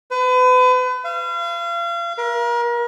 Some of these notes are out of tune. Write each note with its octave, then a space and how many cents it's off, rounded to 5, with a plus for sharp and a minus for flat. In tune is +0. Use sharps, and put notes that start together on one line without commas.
B4 +35
F5 -35
A#4 +35